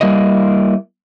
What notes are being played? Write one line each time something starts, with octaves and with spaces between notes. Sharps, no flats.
G3 A#3 E4 D#5